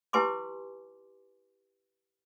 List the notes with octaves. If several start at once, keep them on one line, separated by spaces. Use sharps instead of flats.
E4 G4 B4 G#5 C6 D6